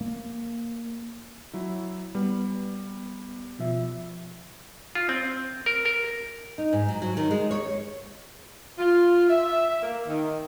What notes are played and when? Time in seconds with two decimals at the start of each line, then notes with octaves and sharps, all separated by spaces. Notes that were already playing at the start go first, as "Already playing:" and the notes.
0.01 A#3
1.53 F#3 E4
2.15 G3 B3
3.59 B2 F3 E5
4.95 F4
5.09 C4
5.66 A#4
5.85 A#4
6.58 D#4
6.73 G#2
6.89 F#3
7.02 F#3
7.17 D#3
7.31 G#3
7.51 C#5
8.78 F4
9.29 E5
9.83 A#3
10.08 D#3